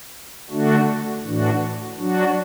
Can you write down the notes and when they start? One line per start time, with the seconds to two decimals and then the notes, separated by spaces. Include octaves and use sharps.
0.50 D3 A3 D4 F#4
1.24 A2 E3 D4 F#4
1.98 F#3 D4 F#4